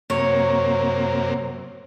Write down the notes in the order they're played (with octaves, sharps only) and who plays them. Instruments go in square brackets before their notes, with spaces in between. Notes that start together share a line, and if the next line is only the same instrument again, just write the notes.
[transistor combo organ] F#2 C3 A#3 [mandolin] C#5